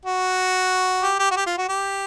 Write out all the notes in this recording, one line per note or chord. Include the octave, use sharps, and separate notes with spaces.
F#4
G4
G4
F#4
G4
F4
F#4
G4